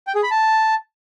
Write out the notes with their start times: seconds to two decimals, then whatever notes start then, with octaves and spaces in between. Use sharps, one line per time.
0.07 G5
0.15 G#4
0.23 B5
0.31 A5